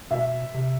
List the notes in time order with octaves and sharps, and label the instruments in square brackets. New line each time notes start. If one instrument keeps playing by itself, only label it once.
[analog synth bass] B2 [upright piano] E5
[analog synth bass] C3